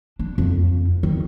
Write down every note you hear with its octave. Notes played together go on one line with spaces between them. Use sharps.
D4
F2
D#3